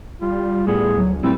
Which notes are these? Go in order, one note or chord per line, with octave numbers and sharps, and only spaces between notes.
G3 F4
A2 A3 B3 G#4
D2 F#3
A#2 G3 A3 C4 E4 B4